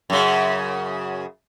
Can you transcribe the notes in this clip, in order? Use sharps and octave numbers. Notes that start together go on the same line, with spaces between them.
F#2 C#3